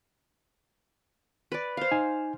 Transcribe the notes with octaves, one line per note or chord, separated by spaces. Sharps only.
B4 D5
C5 F5
D#4 G#5